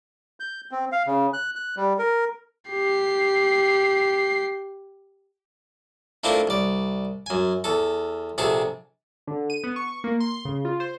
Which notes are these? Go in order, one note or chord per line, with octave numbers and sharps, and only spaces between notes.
G6
C4
F5
C#3
F#6
F#6
G3
A#4
G4 C7
A3 A#3 C4 D4 E4 F4
C2 D5
F#2 G#5
E2 A4
A#1 C3 G#4 A4
D3
D#7
B3
C#6
A#3
C6
C#3
F4
C5